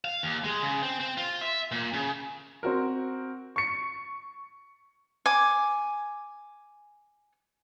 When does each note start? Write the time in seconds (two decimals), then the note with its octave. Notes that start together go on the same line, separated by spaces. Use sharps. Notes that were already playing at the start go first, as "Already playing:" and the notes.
0.04 F5
0.23 D#2
0.44 G#3
0.63 C#3
0.82 C4
1.00 C4
1.17 F4
1.41 E5
1.72 A#2
1.93 C#3
2.63 C4 F#4 A#4
3.56 C#6 C#7
5.26 G#5 D6